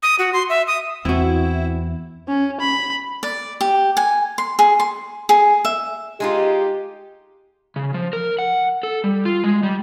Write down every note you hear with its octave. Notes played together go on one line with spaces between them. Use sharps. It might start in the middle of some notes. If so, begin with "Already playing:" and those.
D#6
F#4
C6
E5
D#6
E2 C4 E4 F#4
C#4
B5
D5
G4
G#5
C6
G#4
C6
G#4
E5
G#3 D#4 F4 G4
C#3
F3
A#4
F#5
A4
G3
F4
G#3
G3